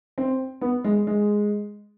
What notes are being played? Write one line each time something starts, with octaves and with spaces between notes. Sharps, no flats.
C4
B3
G#3
G#3